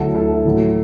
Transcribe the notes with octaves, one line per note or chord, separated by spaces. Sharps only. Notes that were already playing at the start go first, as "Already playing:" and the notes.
Already playing: D2 D3 F#3 E4 A4
E4 A4
A2 F#3